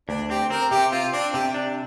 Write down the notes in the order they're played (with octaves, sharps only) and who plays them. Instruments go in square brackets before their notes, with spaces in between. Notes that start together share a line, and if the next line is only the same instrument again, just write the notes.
[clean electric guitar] D2 [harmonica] D4
[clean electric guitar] C4 [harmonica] G4
[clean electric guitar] C4 [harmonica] A#4
[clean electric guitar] C3 [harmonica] G4
[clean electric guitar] C4 [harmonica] F4
[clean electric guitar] C4 [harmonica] D4
[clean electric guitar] C3 [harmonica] G4
[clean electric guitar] D4